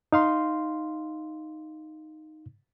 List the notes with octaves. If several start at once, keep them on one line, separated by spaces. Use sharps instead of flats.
D#4 F5 C6